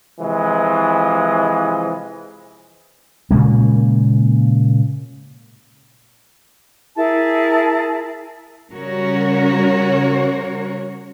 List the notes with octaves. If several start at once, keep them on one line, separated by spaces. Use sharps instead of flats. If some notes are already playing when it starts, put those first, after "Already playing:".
C3 E3 F3 G#3
A#2 C#3 G#3 A#3
E4 G#4 A#4 A5
C#3 G3 C#4 F#4 A#4 C#5